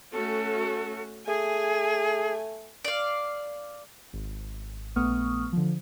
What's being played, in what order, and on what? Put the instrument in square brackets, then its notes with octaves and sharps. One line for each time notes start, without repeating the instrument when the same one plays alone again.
[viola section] A3 C#4 F#4 [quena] A4
[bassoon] A3 [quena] G#4 [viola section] G#5
[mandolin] D5 F5
[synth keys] G#1
A#1 A3 B3 C#6 D#6 F6
D3 F3